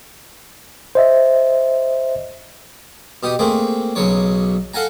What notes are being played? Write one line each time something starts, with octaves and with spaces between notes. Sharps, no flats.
C5 D#5 E5
B2 G4 D#6
A3 A#3 C4 G#4
B1 C#3 F#3 C#5 D6
A4 F5 F#5 G#5 A#5